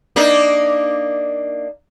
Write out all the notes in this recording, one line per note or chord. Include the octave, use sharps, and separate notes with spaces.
A#3 D4 D#4